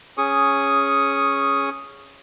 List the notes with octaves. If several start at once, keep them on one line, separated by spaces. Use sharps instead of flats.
C#4 G#4 C#6 D#6